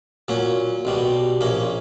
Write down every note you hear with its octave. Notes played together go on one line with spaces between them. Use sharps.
A#2 F#3 C#4
B1 B2 G3
A#1 A#2 A#3 C#4